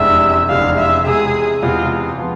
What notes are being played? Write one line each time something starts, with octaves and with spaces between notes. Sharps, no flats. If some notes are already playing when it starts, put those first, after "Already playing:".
Already playing: F1 E2 C3 G#3 D4 E5
F1 E2 C3 G#3 D4 F5
E5
E2 C3 G#3 G#4
E2 C3 G#3 F4
F3 B3